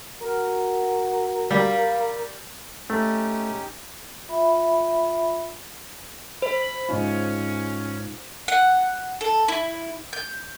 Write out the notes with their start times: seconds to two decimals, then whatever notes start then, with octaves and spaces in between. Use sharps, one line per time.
0.20 F#4 A#4
1.51 G3 F5
2.90 A3 C#4 D#4 G4
4.29 F4 E5 B5
6.42 C5 B5
6.89 G#2 C#4 D#4 F4
8.48 F#5
9.21 A4
9.48 E4
10.13 G6